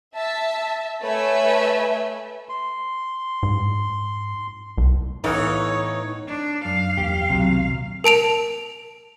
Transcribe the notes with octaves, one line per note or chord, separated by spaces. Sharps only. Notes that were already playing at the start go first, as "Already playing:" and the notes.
E5 A5
A3 B4 C#5 E5 G#5
C6
G#2
C2
A2 E3 B3 D#4 C#5 F5
D4
F#2 F5
E2 F#3 A#3 G4
D#1 B1 C3 F#3
A#4 A5 D7 F7